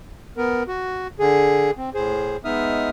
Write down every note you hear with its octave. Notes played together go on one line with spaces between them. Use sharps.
B3 A#4
F#4
D3 G#4
C4
A2 G#4 C5
G#3 B3 D#4 E5 D#6 F6